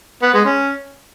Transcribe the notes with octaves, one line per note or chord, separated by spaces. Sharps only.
B3
G#3
C#4